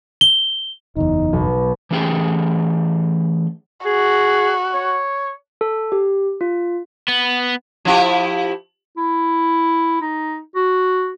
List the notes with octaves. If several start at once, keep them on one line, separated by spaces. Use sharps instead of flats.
G7
F#1 E2 D#4
B1
E3 A3 C#4 G4 G#4 G5
F#4 G#4
C#5
A4
G4
F4
B3
F3 E4 G4
E4
D#4
F#4